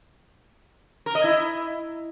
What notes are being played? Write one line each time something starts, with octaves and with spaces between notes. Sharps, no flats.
A#4
D#5
E4